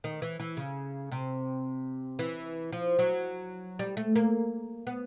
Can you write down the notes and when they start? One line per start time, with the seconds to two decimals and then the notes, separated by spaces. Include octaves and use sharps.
0.04 D#3
0.22 E3
0.40 E3
0.57 C#3
1.12 C3
2.19 E3
2.73 F3
2.99 F#3
3.79 G3
3.97 A3
4.16 A#3
4.87 B3